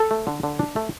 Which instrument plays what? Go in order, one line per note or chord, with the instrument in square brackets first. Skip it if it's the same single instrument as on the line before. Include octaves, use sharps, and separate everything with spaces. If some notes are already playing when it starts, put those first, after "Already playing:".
Already playing: [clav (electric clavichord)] A4
A3
D3
D3
D4
A3